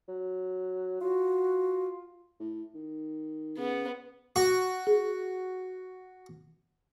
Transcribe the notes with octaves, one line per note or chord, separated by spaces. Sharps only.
F#3
F4 F#4
A2
D#3
C#3 B3
F#4
G#4